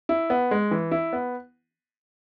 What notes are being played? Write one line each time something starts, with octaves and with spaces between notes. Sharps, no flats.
E4
B3
G#3
E3
E4
B3